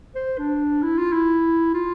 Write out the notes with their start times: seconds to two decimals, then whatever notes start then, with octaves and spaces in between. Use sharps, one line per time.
0.15 C5
0.38 D4
0.83 E4
0.98 F4
1.13 E4
1.74 F4